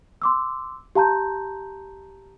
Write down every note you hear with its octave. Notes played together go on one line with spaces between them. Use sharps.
C6 D6 E6
G4 F5 A5 A#5 C6 G6